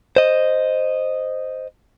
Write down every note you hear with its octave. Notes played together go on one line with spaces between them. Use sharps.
C5 D#5